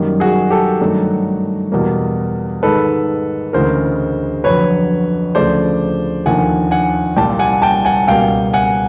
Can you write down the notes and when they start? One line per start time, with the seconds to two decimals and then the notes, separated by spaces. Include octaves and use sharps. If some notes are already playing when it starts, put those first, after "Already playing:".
Already playing: F#2 D#3 G3 A#3
0.20 F#4 G#4
0.50 G4 A4
0.81 G2 D#3 F#3 A3
1.72 E2 B2 G3 A#3
2.63 G#2 D#3 G#3 A4 B4
3.53 D2 C#3 E3 G#3 A#4 C5
4.44 F2 D3 F#3 B4 C#5
5.35 D2 C#3 F3 A3 C5 D5
6.26 D#2 D3 F3 A#3 F#5 G#5
6.71 F#5 G#5
7.17 C2 A#2 G3 G5 A5
7.39 F#5 G#5
7.62 G5 A5
7.85 F#5 G#5
8.07 C#2 B2 G3 A#3 F5 G5
8.53 F#5 G#5